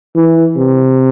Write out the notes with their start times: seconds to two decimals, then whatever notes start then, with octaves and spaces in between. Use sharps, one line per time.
0.15 E3
0.57 C3